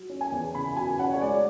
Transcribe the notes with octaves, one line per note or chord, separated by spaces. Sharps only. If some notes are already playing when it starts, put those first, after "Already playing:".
Already playing: F#3
C#4
G#5
E2
C#3 B5
F#3 G#5
C#4 F#5
C#5
G#3 D5